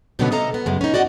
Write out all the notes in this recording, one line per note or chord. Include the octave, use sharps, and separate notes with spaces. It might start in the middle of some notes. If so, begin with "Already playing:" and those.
G#2 B2 D3 G3 B3 C#4
C3 A3 A4 D#5 F5 A#5
B3
F#2 C#3 G#3
C#4 D#4
F#4 D5 D#5 F#5